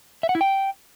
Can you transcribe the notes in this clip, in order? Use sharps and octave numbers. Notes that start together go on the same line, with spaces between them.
E5
F#5
E4
G5